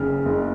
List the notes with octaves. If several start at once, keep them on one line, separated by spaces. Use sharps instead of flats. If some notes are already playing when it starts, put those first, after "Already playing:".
Already playing: F#1 C#3 F6
F#1